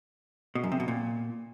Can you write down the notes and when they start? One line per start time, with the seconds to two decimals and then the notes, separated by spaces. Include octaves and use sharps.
0.55 B2
0.64 F#2
0.72 C3
0.80 B2
0.88 A#2